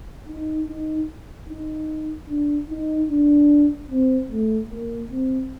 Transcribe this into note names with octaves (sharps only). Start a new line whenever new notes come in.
D#4
D#4
D#4
D4
D#4
D4
C4
A3
A#3
C4